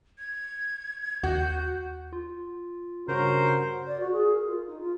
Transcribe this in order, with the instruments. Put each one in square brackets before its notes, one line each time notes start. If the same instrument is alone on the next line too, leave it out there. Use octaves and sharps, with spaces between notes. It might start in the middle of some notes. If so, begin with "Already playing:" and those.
[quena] G#6
[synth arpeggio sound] D#2 [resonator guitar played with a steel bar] F#4 [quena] G6
[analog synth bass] F4
[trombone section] G2 C#4 F#4 [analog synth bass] C#3 [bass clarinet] A#4 [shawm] C5
[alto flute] D5
F#4
G#4
A#4
F4
D#4
F4